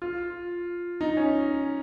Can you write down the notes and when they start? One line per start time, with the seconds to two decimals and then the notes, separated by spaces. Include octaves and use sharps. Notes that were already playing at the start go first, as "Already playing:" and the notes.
0.02 F4
1.01 D#4
1.17 C#4